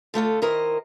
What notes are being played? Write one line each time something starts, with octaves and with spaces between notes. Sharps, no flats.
D3 A3 F4 A4
D#3 E4 A#4 C5 D#5